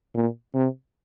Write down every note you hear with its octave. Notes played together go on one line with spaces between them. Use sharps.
A#2
C3